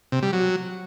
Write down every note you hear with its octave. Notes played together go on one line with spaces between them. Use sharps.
C3
G3
F#3